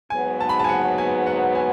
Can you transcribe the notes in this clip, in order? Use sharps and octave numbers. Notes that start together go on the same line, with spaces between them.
G#2 F#3 B3 G#5
A5
B5
A5
G#5
F#5
G#5
F#5
G#5